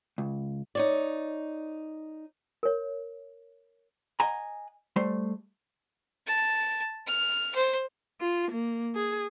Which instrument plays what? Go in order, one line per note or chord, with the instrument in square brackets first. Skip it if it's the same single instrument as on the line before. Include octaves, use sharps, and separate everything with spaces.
[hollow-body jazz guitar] C#2
[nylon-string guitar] D#4 C#5 D5
[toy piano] A#4 C#5
[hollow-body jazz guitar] D#5 F#5 G#5 A#5
G3 A3 C5
[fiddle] A5
F6
C5
[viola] F4
A#3
G#4